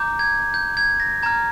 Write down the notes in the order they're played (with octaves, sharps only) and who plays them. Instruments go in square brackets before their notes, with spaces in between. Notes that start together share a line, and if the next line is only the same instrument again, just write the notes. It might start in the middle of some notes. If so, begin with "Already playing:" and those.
Already playing: [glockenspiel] A#5 D6 G6
G#6
G6
G#6
A#6
A#5 F6 G#6